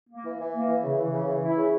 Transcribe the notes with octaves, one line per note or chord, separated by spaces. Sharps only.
A#3
E3
E3
A#3
E3
C#3
E3
C#3
E3
E4
C#3